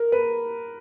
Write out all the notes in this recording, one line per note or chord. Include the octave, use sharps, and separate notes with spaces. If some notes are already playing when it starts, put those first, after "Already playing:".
Already playing: A#4
B4